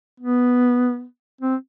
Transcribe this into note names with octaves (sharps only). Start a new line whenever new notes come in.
B3
C4